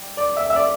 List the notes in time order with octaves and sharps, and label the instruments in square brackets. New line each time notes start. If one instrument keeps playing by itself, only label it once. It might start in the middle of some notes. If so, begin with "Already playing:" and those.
Already playing: [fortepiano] G3
D5
E5
E5
D5